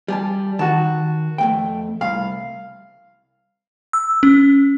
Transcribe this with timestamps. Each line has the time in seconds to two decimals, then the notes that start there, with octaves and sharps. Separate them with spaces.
0.08 G3 G#5 A5
0.59 D#3 F#4 A5
1.38 F2 A3 G5
2.01 C2 F5
3.93 E6
4.23 C#4